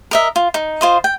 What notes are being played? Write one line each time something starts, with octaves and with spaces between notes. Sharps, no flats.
A#4 D#5 E5
F4
D#4
F4 C5 D#5
G5